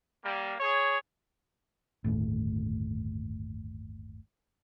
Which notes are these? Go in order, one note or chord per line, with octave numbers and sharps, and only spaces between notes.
G3 A#3
G#4 C#5
G1 D#2 A2